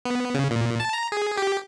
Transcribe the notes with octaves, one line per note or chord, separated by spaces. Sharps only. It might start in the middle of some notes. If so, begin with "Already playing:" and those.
B3
C#3
A#2
A5
A#5
G#4
G4